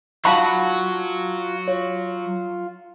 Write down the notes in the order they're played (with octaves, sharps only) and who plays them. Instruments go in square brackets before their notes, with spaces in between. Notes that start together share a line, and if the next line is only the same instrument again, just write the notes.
[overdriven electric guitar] F#3 [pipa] D#4 F#4 [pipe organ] F4 [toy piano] F5 A5 B5
[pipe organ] F4 [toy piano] C#5